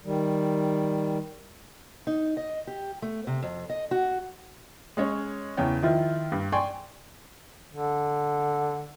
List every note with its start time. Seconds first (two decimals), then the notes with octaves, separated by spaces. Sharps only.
0.05 D#3 G3
2.07 D#4
2.37 D#5
2.67 G4
3.02 A3
3.27 C3
3.43 F2
3.70 D#5
3.91 F#4
4.97 G#3 C#4 C#5
5.57 E2 C#3 C#5 G5
5.83 D#3 F3 E4 F4
6.32 G2
6.52 D5 G5 G#5 C6 C#6
7.74 D3